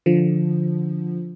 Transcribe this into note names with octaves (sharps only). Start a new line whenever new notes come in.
D3 F3